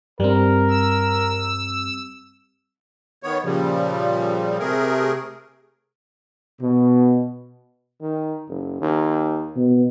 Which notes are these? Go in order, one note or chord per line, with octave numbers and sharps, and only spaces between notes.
G2 G3 C4 A#4
E6
D#3 B3 C#5
A#2 C#3 F3 G3
C3 A3 G#4 A#4
B2
D#3
F#1
D#2
B2